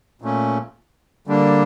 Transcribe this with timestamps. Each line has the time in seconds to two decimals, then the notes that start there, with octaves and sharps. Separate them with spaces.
0.22 A#2 A3 C#4
1.27 D3 G3 A#3 D4